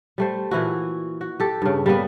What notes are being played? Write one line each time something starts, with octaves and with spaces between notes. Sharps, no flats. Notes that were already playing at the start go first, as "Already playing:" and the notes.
G3 A3 C5
A#2 E3 E4 F#4
F#4
G4 A4
G2 C#3
G3 A#3 B3